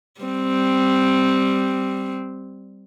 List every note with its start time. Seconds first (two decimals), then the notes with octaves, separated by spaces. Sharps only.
0.21 G3 C4